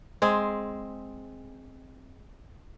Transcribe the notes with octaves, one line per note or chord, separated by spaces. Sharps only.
G#3 C4 G#4